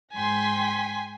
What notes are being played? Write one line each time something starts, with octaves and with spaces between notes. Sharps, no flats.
G#2 G5 G#5 C6 B6